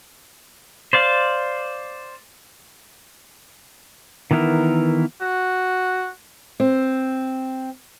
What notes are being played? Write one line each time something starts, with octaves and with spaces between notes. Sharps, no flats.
C5 D5 F5
D#3 E3 B3 E4 A#4
F#4
C4